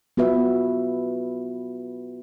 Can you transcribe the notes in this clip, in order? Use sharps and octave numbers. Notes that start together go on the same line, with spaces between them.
B3 F4 F#4 B4 E5